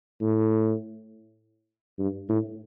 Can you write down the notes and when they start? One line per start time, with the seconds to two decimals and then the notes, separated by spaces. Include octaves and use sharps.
0.21 A2
1.99 G2
2.29 A2